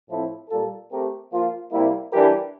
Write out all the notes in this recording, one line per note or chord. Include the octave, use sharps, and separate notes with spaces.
A2 F3 C4 E4 A4
A#2 G3 A#3 F4 A4
A3 C4 G4 A#4
F3 A#3 F4
C3 G3 A#3 E4
E3 G3 D4 G4 A#4